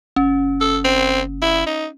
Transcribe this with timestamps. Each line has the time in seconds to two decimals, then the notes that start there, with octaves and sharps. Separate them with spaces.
0.16 F#1 C#4
0.61 A4
0.84 C4
1.42 E4
1.66 D#4